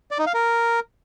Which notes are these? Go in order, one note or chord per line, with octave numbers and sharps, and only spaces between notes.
D5
D#4
F5
A#4